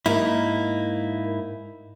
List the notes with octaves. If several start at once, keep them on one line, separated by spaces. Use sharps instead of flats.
G#2 A#3 D#4 E4